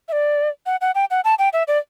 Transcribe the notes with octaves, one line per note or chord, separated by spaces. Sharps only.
E5
D5
F#5
F#5
G5
F#5
A5
G5
E5
D5